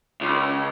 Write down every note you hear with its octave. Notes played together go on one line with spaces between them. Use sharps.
C#2